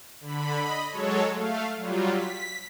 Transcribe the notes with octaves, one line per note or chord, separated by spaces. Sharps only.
D3 B5
D#5 B5
F#3 G#3 A4 C#5
A3 F5
F#3 G3 F4
B6